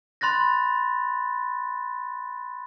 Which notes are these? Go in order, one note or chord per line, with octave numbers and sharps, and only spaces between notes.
B5 C6 F#6 A6 A#6